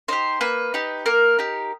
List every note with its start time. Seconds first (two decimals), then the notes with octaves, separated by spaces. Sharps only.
0.08 D#4 G4 C5
0.41 A#3 B4
0.74 D#4 G4
1.06 A#3 A#4
1.39 D#4 G4